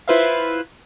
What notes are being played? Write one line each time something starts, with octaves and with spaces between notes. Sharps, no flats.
E4 F4 B4 C5 E5 F5